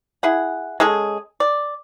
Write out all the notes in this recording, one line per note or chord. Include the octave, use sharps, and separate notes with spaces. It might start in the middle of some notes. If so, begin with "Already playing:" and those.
E4 G#4 F#5
G#3 C#4 G#4 A4
D5